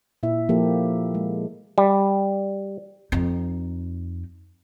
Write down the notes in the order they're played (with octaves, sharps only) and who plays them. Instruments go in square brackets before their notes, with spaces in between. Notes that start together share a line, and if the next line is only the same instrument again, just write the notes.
[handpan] A#2 E4 E5
F3 A#3 G4 A4
G#3
[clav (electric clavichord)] G3
[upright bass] F2 D#4